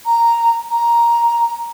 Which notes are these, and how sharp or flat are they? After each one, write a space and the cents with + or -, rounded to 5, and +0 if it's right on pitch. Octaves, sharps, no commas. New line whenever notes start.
A#5 -5
A#5 +10